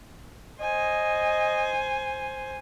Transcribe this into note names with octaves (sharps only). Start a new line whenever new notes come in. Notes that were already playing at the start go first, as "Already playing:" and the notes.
C5 D#5 G#5